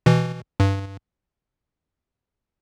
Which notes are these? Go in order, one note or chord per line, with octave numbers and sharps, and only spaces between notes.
B2 E3
G2